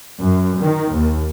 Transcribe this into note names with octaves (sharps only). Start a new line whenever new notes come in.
F#2
D#3
D#2